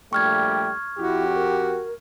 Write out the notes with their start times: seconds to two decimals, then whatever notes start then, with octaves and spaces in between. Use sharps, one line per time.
0.13 A#1 G3 A3 G5 C#6 F6 G#6
0.98 F2 E4 F#4 G4
1.35 A#4